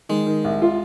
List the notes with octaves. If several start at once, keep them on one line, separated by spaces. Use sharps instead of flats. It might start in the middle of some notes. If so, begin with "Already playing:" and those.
D#3 G#3
D#3
C2
F4